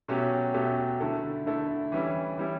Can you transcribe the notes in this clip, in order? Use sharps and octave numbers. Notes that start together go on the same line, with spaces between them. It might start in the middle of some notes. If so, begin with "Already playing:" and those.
B2 F#3 A3 C#4 G4
B2 F#3 A3 C#4 G4
D3 A3 E4 A4
D3 A3 E4 A4
E3 G3 C#4 E4
E3 G3 C#4 E4